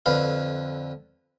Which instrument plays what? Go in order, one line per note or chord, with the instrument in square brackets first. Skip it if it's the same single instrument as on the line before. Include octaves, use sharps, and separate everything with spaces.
[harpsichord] F2 D3 B4 F5